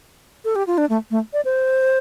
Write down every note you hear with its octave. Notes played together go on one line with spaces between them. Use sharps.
A4
G4
F4
D4
A3
A3
D5
C5